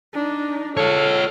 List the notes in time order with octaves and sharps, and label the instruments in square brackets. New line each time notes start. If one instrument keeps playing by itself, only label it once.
[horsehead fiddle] D4 D#4
[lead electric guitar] F4 C#5 [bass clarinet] A4 [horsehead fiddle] F5